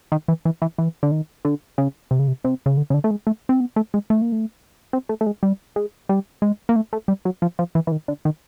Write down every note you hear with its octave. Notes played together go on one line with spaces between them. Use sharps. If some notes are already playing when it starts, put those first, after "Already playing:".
D#3
E3
E3
E3
E3
D3
D#3
D3
C#3
C3
C#3
C3
C3
C#3
D3
C#3
D3
A3
G#3
A3
C4
B3
A3
G#3
A3
A#3
A3
C4
A3
A3
G#3
G3
G#3
G3
G#3
A#3
A3
A3
G3
F#3
F3
F3
E3
E3
D#3
D3
D#3